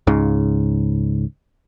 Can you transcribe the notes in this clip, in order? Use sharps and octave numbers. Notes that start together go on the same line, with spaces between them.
C#2 G#2 C#3